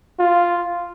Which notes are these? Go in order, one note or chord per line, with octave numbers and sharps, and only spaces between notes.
F4